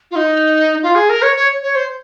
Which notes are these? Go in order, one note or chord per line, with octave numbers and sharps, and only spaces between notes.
F4
D#4
F4
G#4
A#4
C#5
C#5
C#5
C5